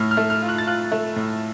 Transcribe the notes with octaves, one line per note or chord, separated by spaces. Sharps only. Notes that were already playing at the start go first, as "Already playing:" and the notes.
Already playing: A2 A3 F6
F6
A3
F6
F4
F#6
A6
F4 F#6
A3
A2